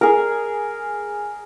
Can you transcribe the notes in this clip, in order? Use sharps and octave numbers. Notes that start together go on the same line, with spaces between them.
G#4 A#4